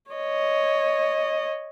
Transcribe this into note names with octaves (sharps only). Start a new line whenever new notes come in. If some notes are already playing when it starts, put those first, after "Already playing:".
C#5 D#5